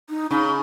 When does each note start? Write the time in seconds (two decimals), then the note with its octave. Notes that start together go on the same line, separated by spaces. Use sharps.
0.10 D#4
0.31 C#3 D#4